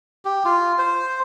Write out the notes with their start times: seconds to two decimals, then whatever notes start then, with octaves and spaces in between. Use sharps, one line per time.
0.25 G4
0.45 F4
0.78 C5